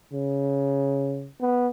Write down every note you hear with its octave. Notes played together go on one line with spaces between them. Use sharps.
C#3
B3